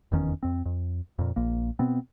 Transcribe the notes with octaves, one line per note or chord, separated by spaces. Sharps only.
F1 E2 D#3 C#4
F2 C4
F2
F2 A#2
A#1 A#3
B2 B3 C4